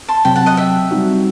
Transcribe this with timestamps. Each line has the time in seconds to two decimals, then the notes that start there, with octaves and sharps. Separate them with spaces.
0.08 A5 C6
0.25 C3 F#3 C4 G5 B5
0.36 F#5 A5
0.46 D#5 F#5
0.57 E5 G5
0.91 G3 C4 D#4 F#4